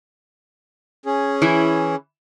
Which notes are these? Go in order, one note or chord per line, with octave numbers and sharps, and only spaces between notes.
C#4 G#4
E3 E4